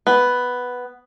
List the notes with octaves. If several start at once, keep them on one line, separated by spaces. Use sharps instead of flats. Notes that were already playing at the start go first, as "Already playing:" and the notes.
B3